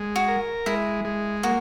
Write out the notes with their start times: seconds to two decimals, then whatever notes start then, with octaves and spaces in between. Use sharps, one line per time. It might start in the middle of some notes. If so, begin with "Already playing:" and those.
Already playing: G#3
0.16 F#4
0.28 A#4
0.66 G#3 E4
1.05 G#3
1.43 A#3 F#4